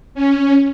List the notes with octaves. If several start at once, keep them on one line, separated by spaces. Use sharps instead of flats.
C#4